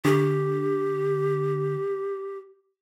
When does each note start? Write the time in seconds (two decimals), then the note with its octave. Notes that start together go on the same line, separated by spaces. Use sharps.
0.05 D3 G4